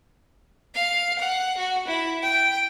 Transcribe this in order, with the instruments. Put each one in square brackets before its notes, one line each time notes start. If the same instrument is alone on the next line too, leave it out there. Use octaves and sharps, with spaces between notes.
[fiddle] F5
F#5
F#4
E4
G5